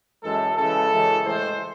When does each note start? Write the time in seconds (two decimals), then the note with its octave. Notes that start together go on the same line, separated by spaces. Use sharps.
0.22 F#2 E3 G#3 A4
0.56 C#3 E3 G#3 A4
0.91 F#2 C#3 E3 G#3
1.25 A2 E3 G#3 C5